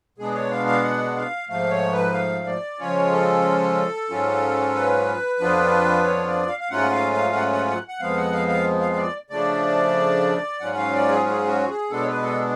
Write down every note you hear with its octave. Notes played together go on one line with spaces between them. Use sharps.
B2 G#3 B3 D4 G#4
C#5
F5
F5
F#5
F5
G#2 F3 A3 F5
C#5
B4
F5
D5
C#3 F3 G#3 C#4 F4 C#5
A4
G#2 F#3 C#4 F4
B4
F2 F3 B3 D4 F4
C#5
D5
F5
F5
G#2 F#3 A3 C#4 F4 F#5
F5
F5
F#5
F#5
F#5
F#5
F2 F3 G#3 B3 F5
F#5
F5
F5
F5
F5
D5
C#3 F3 A3 D4 D5
G#2 F#3 C#4 F4 F#5
F5
D5
G#4
G#4
F#4
G#4
B2 G#3 B3 D4 A4
C#5
B4
A4